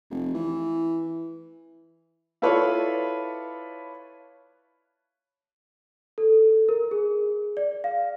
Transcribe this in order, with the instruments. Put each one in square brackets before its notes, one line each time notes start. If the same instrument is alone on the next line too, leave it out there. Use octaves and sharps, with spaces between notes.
[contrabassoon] F1
E3
[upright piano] E4 F4 A4 B4 C#5 D5
[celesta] A4
A#4
G#4
D5
F5